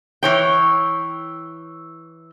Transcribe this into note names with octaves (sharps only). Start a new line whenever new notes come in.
E3 C#5 G5